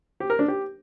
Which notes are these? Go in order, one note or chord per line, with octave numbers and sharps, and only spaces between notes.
G4
A#4
D4
G4